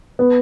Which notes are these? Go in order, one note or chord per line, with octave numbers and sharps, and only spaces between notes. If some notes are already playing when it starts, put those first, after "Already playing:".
B3